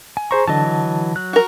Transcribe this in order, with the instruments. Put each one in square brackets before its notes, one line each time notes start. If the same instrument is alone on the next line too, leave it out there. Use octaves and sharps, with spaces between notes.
[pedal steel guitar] G#5
[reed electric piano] G#4 C5 A#5 [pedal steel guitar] C#6
[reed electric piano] D3 A5 [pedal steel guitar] E3 F#3 D#5
[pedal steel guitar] F#3 F#6
[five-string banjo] F#4 A#4